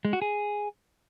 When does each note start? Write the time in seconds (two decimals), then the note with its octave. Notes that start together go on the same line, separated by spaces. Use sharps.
0.05 G#3
0.13 F#4
0.22 G#4